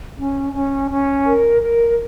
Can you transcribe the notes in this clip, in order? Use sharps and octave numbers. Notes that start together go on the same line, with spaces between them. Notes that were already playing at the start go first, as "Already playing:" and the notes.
C#4
C#4
C#4
A#4
A#4